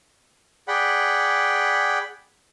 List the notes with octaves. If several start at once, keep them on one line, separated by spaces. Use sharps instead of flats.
G#4 D5 F#5 G5 B5